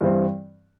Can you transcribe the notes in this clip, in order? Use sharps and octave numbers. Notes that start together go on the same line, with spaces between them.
G2 E3 G3 C4